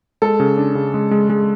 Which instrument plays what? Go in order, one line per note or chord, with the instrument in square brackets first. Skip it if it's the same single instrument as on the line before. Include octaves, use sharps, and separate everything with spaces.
[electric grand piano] G#3 [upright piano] A4
[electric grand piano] C#3
D4
C#3
G#3
G#3
G#3